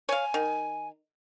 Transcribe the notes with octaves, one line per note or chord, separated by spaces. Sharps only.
C#5 F5 G#5
D#3